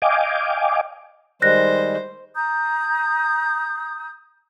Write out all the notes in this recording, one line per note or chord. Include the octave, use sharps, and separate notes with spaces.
D#5 F5 G5 G#5 D6
D#3 G3 G#3 C5 F#6 A#6
A#5 D#6 G6